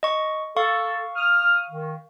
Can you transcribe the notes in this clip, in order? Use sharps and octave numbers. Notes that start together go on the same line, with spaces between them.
D#5 C#6
A4 F5 C#6
D#6 F6
D#3